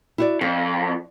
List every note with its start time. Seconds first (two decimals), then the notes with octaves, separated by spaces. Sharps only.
0.18 E4 F#4 D5
0.41 F2 F5